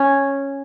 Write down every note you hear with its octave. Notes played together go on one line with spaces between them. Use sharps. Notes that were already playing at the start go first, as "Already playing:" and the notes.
Already playing: C#4